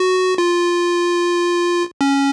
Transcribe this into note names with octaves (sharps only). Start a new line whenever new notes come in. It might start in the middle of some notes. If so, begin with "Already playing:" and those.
Already playing: F#4
F4
C#4